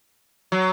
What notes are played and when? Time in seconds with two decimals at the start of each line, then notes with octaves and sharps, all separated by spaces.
0.52 F#3